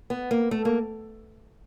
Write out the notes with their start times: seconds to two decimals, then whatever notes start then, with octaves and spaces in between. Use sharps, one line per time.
0.10 B3
0.31 A#3
0.51 A3
0.65 A#3